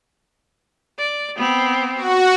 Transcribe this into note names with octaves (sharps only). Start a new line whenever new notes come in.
D5
B3 C4
F#4